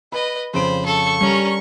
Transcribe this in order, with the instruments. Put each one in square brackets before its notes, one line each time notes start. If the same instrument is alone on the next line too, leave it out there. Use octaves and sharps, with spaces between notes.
[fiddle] B4 D#5 [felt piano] B5
[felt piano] F2 C#3 D7 [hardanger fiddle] C5 [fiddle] B5
[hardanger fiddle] A4 [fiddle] C#6
[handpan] G3 [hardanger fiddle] C#4 A#4